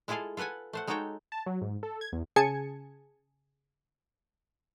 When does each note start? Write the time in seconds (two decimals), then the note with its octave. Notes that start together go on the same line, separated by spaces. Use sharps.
0.08 G#3 E4 F4 G#4 A4 F5
0.37 F4 A4 B4 F#5 G#5
0.73 A3 C5 F#5
0.87 G#3 D#4 F#4 A4 C#5 G5
1.32 A5
1.46 F#3
1.62 G#2
1.83 A4
2.01 G#6
2.12 E2
2.36 C#3 G#4 G#5 A5 G#6 C#7